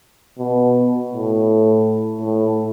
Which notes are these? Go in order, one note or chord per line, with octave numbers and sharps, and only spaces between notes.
B2
A2
A2